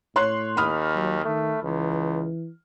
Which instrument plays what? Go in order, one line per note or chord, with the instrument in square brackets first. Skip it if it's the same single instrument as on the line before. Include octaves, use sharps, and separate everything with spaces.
[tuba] A2 [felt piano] C#5 C6 F#6
[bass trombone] D#2 [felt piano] B5 D#6 F6
[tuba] F#3
[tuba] D#3 [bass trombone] A3
[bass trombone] C#2 [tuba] E3